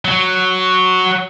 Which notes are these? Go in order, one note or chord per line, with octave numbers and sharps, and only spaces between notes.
F#3